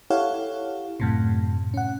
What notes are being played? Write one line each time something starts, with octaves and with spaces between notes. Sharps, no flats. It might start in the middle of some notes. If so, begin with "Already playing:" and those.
E4 G4 A4 C#5 F5 F#5
F#2 A2 C3
C#4 F#5